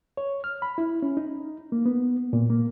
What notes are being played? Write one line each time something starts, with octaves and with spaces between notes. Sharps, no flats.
C#5
F6
B5
E4
C#4
D#4
A#3
B3
A#2
A#3